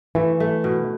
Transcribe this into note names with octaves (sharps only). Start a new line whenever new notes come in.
E3 A3
A3
B2